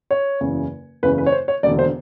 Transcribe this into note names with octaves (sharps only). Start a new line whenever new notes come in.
C#5
F#1 E2 C#3
F#1 E2 C#3 B4
B4
C#5
C5
C#5
E1 D#2 D3 D5
C5